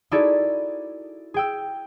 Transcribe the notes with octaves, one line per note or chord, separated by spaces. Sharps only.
D#4 E4 F#4 G#4 A4 D5
G#4 G5 E6